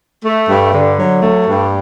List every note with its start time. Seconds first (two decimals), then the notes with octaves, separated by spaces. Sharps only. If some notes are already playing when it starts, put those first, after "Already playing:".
0.24 A3
0.49 G2
0.73 D3
0.97 F#3
1.22 A3
1.46 G2